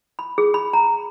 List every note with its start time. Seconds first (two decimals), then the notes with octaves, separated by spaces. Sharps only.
0.19 B5
0.38 G#4
0.54 B5
0.73 A#5